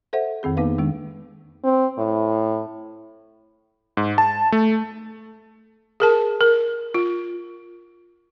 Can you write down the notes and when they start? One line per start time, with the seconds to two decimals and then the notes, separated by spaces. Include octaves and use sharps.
0.13 A4 C5 E5 F#5
0.43 F2 D#3 C4 G#4
0.57 A#3 B3 D#4 B4 F5
0.78 D#3 G#3 D4
1.64 C4
1.98 A2
3.97 G#2
4.18 A5
4.52 A3
6.00 G#4 A#4 A5
6.41 A#4
6.94 F4